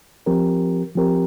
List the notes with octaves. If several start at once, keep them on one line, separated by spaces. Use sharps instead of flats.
F3 C4 G4 A#4
F3 C4 G4 A#4